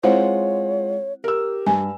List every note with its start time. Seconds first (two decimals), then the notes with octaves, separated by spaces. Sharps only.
0.03 G#3 C4 E4 F4 C5 C#5 F#5
1.24 G4 A#4 E6
1.66 G2 G#5